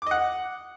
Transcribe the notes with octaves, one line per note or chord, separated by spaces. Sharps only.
D#5 F#5 D6